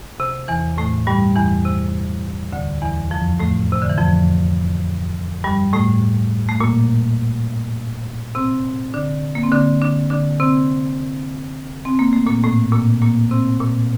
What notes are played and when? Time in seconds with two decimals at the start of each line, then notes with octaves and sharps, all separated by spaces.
0.20 C3
0.48 E2 E3
0.78 A2 A3
1.07 G2 G3
1.36 E2 E3
1.65 C3
2.52 D2 D3
2.82 E2 E3
3.11 F2 F3
3.40 A2 A3
3.72 C3
3.82 D3
3.89 E3
3.98 F2 F3
5.44 G2 G3
5.73 A2 A3
6.49 A3
6.60 A#2 A#3
8.35 C3 C4
8.94 D3 D4
9.35 A#3
9.43 C4
9.52 D3 D4
9.81 D3 D4
10.10 D3 D4
10.40 C3 C4
11.85 C4
11.99 A#3
12.13 A3
12.26 A#2 A#3
12.43 A2 A3
12.72 A#2 A#3
13.02 A#2 A#3
13.31 C3 C4
13.60 A#2 A#3